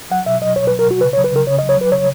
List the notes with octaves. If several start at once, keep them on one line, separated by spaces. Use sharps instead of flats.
F#3 F#5
B2 E5
F#3 D#5
B2 C#5
B4
F#3
A#4
B2 F#4
C#3 B4
C#5
F#3
B4
C#3 A#4
C#3 C#5
D#5
F#3
C#5
F#3 B4
C#3 C#5